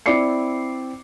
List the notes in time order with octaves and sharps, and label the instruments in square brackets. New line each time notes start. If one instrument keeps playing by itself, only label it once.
[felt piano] C4 E4 D5 D6 C7 C#7